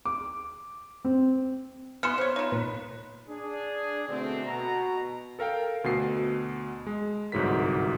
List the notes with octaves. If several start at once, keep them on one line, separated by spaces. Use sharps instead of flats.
D6
C4
G#3 B3 C6 F6 C#7 E7
C5 C#5
D#4 F4 C#5 B5
A#2 B4
D4 G#4
B2 D3 A3 C4
B2 A#5
A4 A#4 F5 G5
D2 B2 C7
G#3
G1 C2 G#2 F#3 A#4 B6